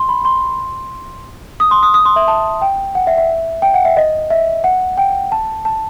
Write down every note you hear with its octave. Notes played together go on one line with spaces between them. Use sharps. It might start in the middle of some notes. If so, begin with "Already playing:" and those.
Already playing: C6
B5
C6
D#6
C6
D#6
D#6
C6
E5
A5
G5
F#5
E5
E5
G5
F#5
E5
D#5
E5
F#5
G5
A5
A5